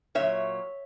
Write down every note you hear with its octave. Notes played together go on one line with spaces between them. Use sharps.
A#2 F#3 C#5 E5